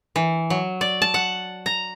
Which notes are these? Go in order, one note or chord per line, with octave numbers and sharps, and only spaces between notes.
E3
F#3
D5
A5
F#5
A#5